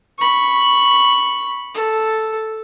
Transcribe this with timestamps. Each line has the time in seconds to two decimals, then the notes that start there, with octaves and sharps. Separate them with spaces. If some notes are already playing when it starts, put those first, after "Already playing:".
0.18 B5 C#6
1.75 A4